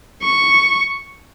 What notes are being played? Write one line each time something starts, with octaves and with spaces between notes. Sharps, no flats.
C#6